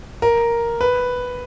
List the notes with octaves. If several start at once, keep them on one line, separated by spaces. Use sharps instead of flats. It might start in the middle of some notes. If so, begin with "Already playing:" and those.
A#4
B4